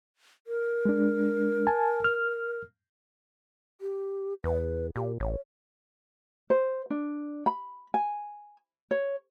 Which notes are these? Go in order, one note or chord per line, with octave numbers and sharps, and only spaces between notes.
A#4
G#3 D4
G#5 A5
F6
G4
E2 B4
A#2 G4
A1 C#5
C5
D4
B5
G#5
C#5